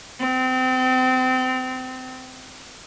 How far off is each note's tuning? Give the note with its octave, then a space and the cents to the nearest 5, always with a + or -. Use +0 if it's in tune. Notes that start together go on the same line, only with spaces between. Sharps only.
C4 -30